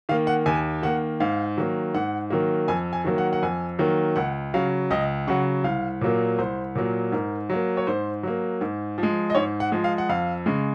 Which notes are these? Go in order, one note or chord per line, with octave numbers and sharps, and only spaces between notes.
D#3 A#3 F5
F#5
D#2 G#5
D#3 A#3 F#5
G#2 F5
D#3 F#3 A#3
G#2 F#5
D#3 F#3 A#3
F2 G#5
G#5
D#3 F#3 A#3
F#5
F#5
F2 G#5
D#3 F#3 A#3
C#2 F#5
C#3 F#3 F5
C#2 D#5
C#3 F#3 F#5
C2 F5
A#2 F#3 A#3
C2 C5
A#2 F#3 A#3
G#2 A#4
F#3 A#3
C#5
G#2 C5
F#3 A#3
G#2
F3
G#3
D#5
G#2 C#5
F#5
F3 G#3
F5
F#5
F2 F5
C#3 G#3